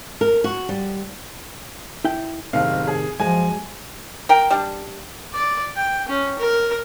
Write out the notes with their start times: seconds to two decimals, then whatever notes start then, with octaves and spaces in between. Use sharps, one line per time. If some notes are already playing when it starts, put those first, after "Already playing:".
0.21 A#4
0.44 F#4
0.69 G3
2.04 E4 G5
2.53 F#1 A2 C3 D#3 F5
2.87 G#4
3.20 F#2 F3 G#3 G#5
4.29 A#4 G5
4.51 G3 D4
5.33 D5
5.76 G5
6.08 C#4
6.39 A#4